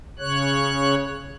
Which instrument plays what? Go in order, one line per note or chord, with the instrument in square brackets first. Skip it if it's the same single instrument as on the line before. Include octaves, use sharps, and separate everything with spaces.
[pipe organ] C#3 C#5 F#6